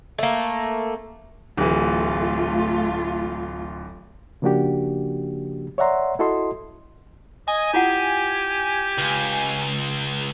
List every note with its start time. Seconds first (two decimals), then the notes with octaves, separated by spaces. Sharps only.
0.19 A3 A#3
1.57 D1 E3 A3 F4
4.42 C#3 F3 A#3 D4 F#4 G4
5.78 C#5 D5 E5 F#5 A#5 C6
6.19 E4 F#4 A4 D#5 C6
7.48 D#5 G#5
7.74 E4 F4 G4 F#5
8.99 C#2